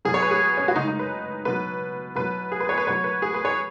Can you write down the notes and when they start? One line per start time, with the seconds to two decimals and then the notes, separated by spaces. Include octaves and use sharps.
0.05 B2 F#3 G#4
0.14 C#5
0.22 B4
0.31 G#4
0.57 C#4
0.68 F#4
0.76 C#3 G#3 D#4
0.88 D#4
0.99 B4
1.45 B2 F#3 B4
2.15 B2 F#3 B4
2.52 G#4
2.60 B4
2.69 C#5
2.78 B4
2.87 B2 F#3 C#5
3.04 B4
3.22 G#4
3.34 B4
3.45 C#5